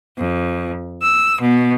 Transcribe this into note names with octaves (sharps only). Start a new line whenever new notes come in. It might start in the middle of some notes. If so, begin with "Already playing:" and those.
F2
E6
B2